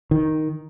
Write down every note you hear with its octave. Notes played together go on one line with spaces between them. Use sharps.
D#3